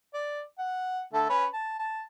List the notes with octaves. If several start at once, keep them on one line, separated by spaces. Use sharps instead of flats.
D5
F#5
D3 A3 A4
C#4 B4 C#5
A5
A5